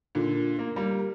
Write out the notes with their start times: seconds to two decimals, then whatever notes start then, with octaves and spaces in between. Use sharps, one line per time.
0.15 A#2 D3
0.59 A#3
0.76 G3 A#3